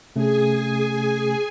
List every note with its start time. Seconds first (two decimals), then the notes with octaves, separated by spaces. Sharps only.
0.16 C3 A3 C#4 G#4 G#5